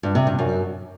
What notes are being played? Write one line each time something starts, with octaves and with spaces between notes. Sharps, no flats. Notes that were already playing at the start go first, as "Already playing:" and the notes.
G2
C3
G2
F#2